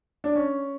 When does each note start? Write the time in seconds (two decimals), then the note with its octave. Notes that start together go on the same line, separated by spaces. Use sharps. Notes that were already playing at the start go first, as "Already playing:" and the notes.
0.24 D4
0.36 C#4